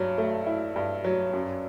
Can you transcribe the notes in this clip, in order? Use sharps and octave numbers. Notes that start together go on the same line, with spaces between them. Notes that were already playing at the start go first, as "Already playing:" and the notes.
Already playing: G2 F#3
A3
E4
G2
F#3
F#2